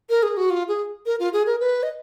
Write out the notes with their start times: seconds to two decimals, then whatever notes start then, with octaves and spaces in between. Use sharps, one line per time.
0.09 A#4
0.23 G#4
0.37 F#4
0.50 F4
0.68 G#4
1.06 A#4
1.20 F4
1.33 G#4
1.46 A#4
1.60 B4
1.83 D#5